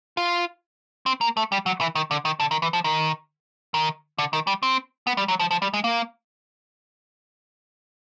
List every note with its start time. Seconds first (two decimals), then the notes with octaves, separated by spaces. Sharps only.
0.17 F4
1.06 C4
1.21 A#3
1.37 A3
1.52 G3
1.66 F#3
1.81 E3
1.95 D#3
2.11 D3
2.25 D#3
2.40 D3
2.51 D#3
2.62 E3
2.73 F3
2.84 D#3
3.74 D#3
4.18 D3
4.33 D#3
4.47 G3
4.63 C4
5.07 B3
5.17 G3
5.28 F#3
5.40 F3
5.51 F3
5.62 G3
5.74 G#3
5.84 A#3